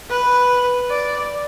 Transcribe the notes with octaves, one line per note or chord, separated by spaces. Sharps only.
B4
D5